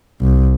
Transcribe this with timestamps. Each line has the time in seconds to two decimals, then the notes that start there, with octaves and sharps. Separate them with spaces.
0.21 C2